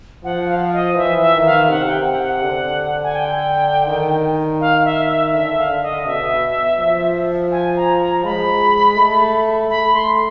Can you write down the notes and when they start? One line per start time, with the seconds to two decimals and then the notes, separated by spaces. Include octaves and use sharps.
0.24 F3 F#5
0.48 F5
0.73 D#5
0.96 E3 E5
1.21 E5
1.34 D#3
1.46 F5
1.69 C3 F#5
1.88 G5
2.06 F#5
2.24 F#5
2.42 D3
3.03 G#5
3.16 G5
3.87 D#3
4.61 F5
4.85 E5
5.09 E5
5.33 D3 E5
5.58 F5
5.69 D3
5.82 D#5
6.06 B2 E5
6.79 F3
7.52 G#5
7.76 A#5
8.00 A#5
8.24 G#3 B5
8.97 A3
9.70 A3 B5
9.94 C6